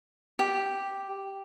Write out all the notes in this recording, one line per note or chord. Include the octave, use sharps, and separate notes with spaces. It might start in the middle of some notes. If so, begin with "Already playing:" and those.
G4